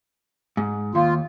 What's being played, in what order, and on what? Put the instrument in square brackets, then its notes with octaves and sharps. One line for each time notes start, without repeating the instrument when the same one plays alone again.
[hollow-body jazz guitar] G#2
[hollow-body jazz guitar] D#2 [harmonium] F4